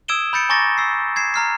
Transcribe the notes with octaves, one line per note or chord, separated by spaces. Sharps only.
D#6 E6 G#6 D7 E7 G7
B5 G6 A6 C#7 D7
G#5 A#5 C#6 D6 A6 A#6
E6 C7
G#6 C7 E7
A#5 F6 C7